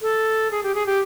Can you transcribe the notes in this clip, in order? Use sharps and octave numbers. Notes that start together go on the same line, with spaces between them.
A4
G#4
G4
G#4
G4